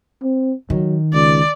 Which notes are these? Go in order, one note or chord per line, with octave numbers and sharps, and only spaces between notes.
C4
D#3 F#3
C#2 D5